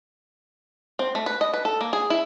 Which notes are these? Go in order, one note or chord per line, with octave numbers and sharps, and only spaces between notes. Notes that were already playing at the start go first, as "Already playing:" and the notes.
C4
A3
B4
D#5
B4
A4
A#3
G#4
E4